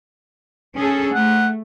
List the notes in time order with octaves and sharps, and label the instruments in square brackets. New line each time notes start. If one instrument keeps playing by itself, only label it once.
[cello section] C#4 G#4 A4
[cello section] A3 [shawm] F#5